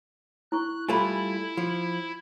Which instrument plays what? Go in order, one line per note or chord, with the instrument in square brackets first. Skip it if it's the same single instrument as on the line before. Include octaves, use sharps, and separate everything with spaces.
[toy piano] E4 C#6 [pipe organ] F#6
[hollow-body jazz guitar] G3 A3 F4 [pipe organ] E4 [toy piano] G#5 B5
[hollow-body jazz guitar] F3